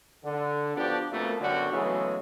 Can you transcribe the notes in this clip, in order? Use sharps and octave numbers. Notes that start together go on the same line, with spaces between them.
D3
F3 B3 D4 F#4 G4
F2 B2 A3 A#3
F#2 B2 D3 G3 F#4
C#3 E3 F#3 G#3 A3 B3